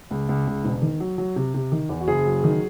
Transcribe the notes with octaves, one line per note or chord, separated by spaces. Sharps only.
C#2
C#2
C#2
E1
D#3
F#3
F#3
C3
C3
D#3
E2
F#4
F#1 G#4
F#3
D#3